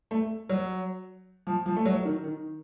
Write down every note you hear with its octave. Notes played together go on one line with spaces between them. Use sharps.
A3
F#3
F3
F3
A3
F#3
D#3
D#3